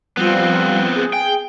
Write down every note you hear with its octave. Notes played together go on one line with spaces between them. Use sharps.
F3 G3 B3 C4 F4
G#4
G5